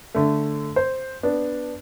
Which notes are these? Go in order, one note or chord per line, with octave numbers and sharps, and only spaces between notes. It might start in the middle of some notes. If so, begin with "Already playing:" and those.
D3 A3
C5
B3 D4